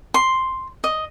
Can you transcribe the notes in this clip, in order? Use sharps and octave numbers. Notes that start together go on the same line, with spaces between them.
C6
D#5